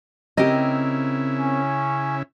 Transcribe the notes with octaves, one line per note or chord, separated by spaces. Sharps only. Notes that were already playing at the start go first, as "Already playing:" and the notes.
C#3 C4 E4 G4 A#4 D#5
C#4